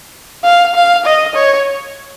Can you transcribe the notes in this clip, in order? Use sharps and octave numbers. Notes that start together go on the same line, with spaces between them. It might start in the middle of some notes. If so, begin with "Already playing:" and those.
F5
F5
D#5
C#5